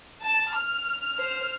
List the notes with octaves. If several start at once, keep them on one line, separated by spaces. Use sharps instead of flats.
A5
F6
C5